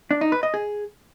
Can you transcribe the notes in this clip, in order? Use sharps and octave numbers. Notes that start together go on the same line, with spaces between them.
D4
D#4
B4
D#5
G#4